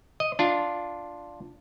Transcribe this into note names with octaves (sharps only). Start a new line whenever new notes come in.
D#5
D4 F4